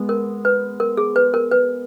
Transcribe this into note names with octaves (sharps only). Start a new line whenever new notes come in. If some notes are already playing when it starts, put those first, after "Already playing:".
Already playing: G#3 B3
A#4
B4
A#4
G#4
B4
A#4
B4